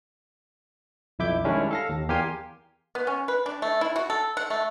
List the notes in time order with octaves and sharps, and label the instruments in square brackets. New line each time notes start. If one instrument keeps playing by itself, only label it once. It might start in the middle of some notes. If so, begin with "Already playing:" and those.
[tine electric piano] B1 F2 E4 E5 D6 G6
D#3 G3 G#3 C#4 D4 E4
A4 F5 A#6
D#2
E2 G4 A#4 F5 G#5 C6
[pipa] B3
C#4
B4
D4
A3
E4
F#4
A4
F#5
A3